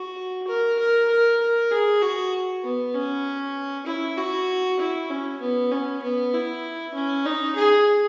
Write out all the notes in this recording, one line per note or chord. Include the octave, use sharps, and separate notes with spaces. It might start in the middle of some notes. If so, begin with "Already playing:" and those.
Already playing: F#4
A#4
A#4
A#4
A#4
G#4
F#4
B3
C#4
E4
F#4
E4
C#4
B3
C#4
B3
E4
C#4
D#4
G#4